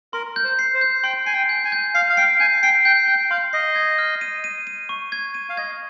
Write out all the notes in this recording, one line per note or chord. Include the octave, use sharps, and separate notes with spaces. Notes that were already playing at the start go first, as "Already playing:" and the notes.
A#4 C6
G6
C5
C7
C5
G6
G5 C6
G#5 C7
G5
G6
G#5
G6
F5 C7
F5
G5 C7
G#5 G6
G5 C7
G5 G6
G5 G6
F5 C6
D#5 C7
G#6
F6
D#7
D#7
D#7
C#6
G#6
D#7
F5
D#5 G#6